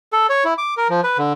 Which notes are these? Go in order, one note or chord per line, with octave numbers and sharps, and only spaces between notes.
A4
C#5
E4
D6
A#4
F3
B4
D3